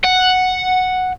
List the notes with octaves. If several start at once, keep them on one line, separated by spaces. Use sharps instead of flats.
F#5